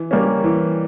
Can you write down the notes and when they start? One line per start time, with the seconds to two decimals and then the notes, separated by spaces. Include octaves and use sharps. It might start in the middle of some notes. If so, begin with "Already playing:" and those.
Already playing: E3
0.11 G3 A#3 C#4
0.44 E3